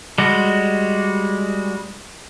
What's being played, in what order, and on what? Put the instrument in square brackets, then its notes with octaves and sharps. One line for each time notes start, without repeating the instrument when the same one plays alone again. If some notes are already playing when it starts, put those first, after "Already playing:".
[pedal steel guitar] G3 G#3 F#4